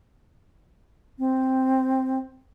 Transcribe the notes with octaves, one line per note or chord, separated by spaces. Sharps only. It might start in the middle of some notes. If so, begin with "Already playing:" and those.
C4